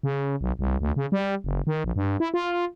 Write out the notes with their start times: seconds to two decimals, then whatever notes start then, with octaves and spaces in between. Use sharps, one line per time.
0.03 C#3
0.41 B1
0.59 C2
0.81 D2
0.96 C#3
1.12 G3
1.44 F#1
1.67 D#3
1.84 A#1
1.96 G2
2.20 E4
2.34 F4